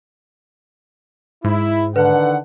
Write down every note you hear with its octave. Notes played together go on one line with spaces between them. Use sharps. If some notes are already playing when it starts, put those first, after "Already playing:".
G#2 E4
D3 D#3 A4 B4 F#5